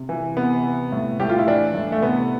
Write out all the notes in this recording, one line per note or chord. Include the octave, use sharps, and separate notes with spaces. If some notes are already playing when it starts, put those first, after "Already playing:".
Already playing: C3
E3
C3 B3
C3
A2
A2 G4
F4
E4
E3 D4
A2
A3
C3 B3